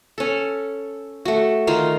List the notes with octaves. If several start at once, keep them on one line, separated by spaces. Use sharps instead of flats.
C#4 A4
A3 F#4
D#3 D#4 F4 F5